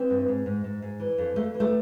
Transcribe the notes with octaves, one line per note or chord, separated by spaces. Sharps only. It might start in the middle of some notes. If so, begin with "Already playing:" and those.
Already playing: E3 C4
G2
G#2
G#2
G#2
G#2
E3
F2
F2 A3
E3
A3